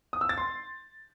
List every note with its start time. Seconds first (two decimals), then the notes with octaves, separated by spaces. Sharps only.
0.13 D#6
0.21 E6
0.29 A6
0.38 C6